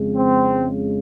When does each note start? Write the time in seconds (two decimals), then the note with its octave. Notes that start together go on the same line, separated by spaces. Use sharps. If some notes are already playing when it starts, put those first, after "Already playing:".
Already playing: F2 C#3 G#3
0.15 C4